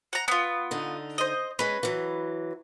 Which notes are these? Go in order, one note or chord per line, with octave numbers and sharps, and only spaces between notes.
F#5 A#5
B3 F4
D3 D#4
C5 D#5
G#3 C#4 B4
E3 F#3